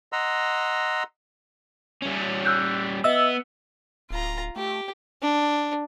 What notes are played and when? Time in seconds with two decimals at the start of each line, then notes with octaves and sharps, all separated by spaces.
0.12 D#5 F#5 A#5 C6 E6
2.02 G3 C#4
2.45 E6 F#6 G6
3.04 B3 D#5 E5 E6
4.10 D1 F4 A#5
4.56 A3 G4
5.22 D4